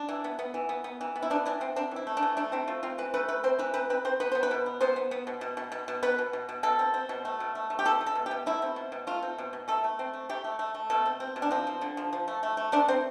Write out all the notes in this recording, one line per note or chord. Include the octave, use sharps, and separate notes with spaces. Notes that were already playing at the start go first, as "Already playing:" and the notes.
Already playing: D4
E3
B3
B3
E3
B3
B3
E3
B3
E4
B3 D4
E3 D4
B3 C4
C4 D4
E3 E4
A3
D4
E3
A3 D4
C4 E4
A3 F4
C4 F4
E3 B4
A3 B4
A3 B4
C4 C5
E3 B4
C4 B4
C4 B4
C4 C5
B3 B4
B3 C5
B4
B2
B3
B3 C5
B3
B3
B2
B2
B2
B2
B2
B3 B4
B2
B2
B2
B2 A4
C4
C4
B2
A3
B2
A3
A3
G4
B2 A4
A3
A4
B2
G4
B2
A3 E4
C4
B2
B2
A3 F4
C4
B2
B2
A3 A4
A3
C4
A3
A3 G4
A3
A3
A3
B2 A4
C4
C4
B2
D4
F3 C4
F3
D3
F3
F3
A3
A3
A3
A3 D4
C4 C5